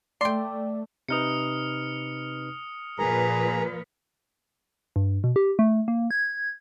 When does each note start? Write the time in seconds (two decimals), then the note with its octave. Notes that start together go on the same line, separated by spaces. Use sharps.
0.21 A3 D5 G5 C6
1.08 C3 D#4 B4 D#6 F6 C#7
2.99 A#2 F3 G#4 A#4 B4 A#5
4.96 G2
5.24 B2
5.36 G4
5.59 A3
5.88 A#3
6.11 G#6